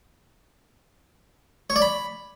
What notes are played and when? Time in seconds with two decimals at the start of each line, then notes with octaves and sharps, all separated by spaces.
1.70 C#5
1.76 D5
1.82 B5